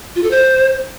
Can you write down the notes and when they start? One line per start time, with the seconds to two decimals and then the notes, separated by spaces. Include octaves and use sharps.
0.16 F4
0.23 A4
0.31 C5